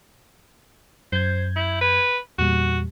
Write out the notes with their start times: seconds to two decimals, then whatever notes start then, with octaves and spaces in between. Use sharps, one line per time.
1.12 F#2 C5 G6 G#6
1.56 E4
1.81 B4
2.39 E2 A#2 G3 F#4